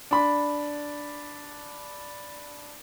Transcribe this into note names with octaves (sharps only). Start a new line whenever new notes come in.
D4 B5